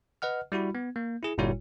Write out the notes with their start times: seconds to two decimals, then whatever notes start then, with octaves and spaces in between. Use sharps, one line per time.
0.22 B4 D#5 F#5 F6
0.52 G3 E4 F#4 B5
0.75 B3
0.96 A#3
1.23 E4 G#4
1.38 G1 A#2 G3 E4 F#4 C#5